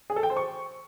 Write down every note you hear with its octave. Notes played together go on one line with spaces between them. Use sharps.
G#4
A4
G5
C5
C#6